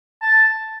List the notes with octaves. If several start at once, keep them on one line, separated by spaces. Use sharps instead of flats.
A5